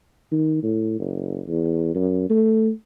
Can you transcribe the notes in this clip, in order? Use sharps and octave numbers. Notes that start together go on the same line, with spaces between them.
D#3
A2
F#1
E2
F#2
A3